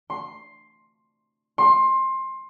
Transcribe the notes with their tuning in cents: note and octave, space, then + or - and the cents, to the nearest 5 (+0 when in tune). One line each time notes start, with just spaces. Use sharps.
C6 +10
C6 +20